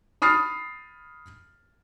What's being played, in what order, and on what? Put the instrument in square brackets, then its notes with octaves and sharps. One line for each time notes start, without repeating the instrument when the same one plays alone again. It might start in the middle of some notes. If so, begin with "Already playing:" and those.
[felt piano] B5 D#6 F6 A6 C7